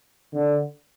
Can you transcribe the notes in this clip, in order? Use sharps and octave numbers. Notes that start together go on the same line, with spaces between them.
D3